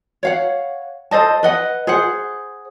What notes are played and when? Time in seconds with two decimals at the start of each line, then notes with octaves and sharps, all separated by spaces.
0.23 C#5 F5 F#5
1.11 A4 C5 D#5 A5
1.43 B4 D#5 F#5
1.87 G#4 C5 F#5